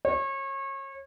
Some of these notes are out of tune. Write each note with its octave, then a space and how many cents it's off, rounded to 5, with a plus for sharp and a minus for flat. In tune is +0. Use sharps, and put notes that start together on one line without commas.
C#5 -30